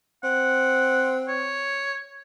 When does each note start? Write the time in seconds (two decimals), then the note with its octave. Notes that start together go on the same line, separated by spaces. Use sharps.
0.24 C4 F#5
1.28 C#5